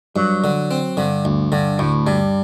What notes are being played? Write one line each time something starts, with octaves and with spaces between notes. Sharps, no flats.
G2 F#3
D3
C4
G2 D3
D2
G2 D3
D2 A2
G2 G3